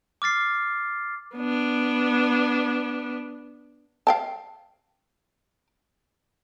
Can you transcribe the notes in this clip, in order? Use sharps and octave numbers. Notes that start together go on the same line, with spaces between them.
D6 F6 A6 C7
B3 D4
F5 G5 A5